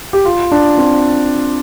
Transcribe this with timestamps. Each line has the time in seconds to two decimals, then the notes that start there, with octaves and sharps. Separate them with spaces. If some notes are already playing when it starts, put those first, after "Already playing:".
0.13 G4
0.25 F4
0.52 D4
0.78 C4